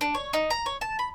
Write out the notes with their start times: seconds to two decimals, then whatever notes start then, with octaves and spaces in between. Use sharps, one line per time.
0.01 D4
0.15 C#5
0.33 D#4
0.50 A#5
0.66 C#5
0.81 A5
0.99 B5